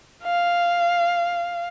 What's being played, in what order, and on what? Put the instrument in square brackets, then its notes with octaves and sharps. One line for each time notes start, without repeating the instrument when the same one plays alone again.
[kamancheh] F5